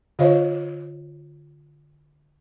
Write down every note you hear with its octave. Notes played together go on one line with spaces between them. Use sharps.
D3 F4 C5 C#5 D#5 F5